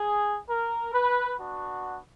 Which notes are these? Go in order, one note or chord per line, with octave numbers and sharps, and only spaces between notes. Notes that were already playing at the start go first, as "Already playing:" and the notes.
Already playing: G#4
A#4
B4
B3 D4 F#4